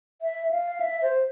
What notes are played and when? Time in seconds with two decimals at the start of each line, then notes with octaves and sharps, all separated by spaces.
0.22 E5
0.51 F5
0.75 F5
0.80 E5
1.02 C5